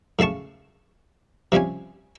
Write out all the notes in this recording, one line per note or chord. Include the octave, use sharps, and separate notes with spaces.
A2 C#3 F5 A5 C#6
C3 F3 G3 C#4 G#5